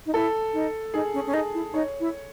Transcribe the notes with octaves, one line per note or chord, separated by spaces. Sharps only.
D#4
E4 A4
D#4
D#4 G#4
C#4
C#4
D#4 G#4
E4
D#4 C#5
E4